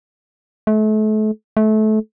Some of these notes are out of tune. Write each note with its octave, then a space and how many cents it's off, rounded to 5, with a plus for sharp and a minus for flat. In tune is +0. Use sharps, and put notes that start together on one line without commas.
A3 -35
A3 -25